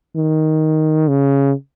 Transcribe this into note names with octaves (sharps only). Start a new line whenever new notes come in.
D#3
C#3